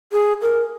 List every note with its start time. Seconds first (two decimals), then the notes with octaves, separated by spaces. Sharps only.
0.12 G#4
0.41 A#4